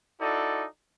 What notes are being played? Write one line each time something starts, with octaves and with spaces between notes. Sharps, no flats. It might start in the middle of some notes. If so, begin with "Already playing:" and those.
D#4 E4 F#4 A4 D5